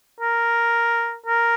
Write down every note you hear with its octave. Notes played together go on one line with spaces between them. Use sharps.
A#4
A#4